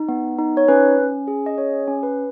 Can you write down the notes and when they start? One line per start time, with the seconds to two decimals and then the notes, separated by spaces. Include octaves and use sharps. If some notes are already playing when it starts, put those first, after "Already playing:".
Already playing: D#4
0.08 B3
0.38 D#4
0.57 C#5
0.68 C#4 B4
0.98 C#4
1.28 G#4
1.46 D#5
1.57 C#4 C#5
1.87 C#4
2.03 B4